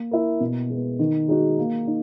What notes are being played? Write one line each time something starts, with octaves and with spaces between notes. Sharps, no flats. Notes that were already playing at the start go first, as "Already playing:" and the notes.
Already playing: A#3
E4 A#4
B2
G#3 B3
D#3
G#3 D#4 F#4
A#3
D#4